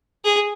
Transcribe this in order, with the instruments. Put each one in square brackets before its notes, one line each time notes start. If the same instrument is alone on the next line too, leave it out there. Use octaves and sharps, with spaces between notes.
[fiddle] G#4